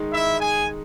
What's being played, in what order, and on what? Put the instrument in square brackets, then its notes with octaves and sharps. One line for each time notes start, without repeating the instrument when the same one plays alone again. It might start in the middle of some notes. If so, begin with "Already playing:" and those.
Already playing: [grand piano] D#3 G#3 D#4
[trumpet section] E4 E5
G#4 G#5